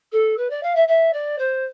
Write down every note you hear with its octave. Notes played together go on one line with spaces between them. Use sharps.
A4
B4
D5
F5
E5
E5
D5
C5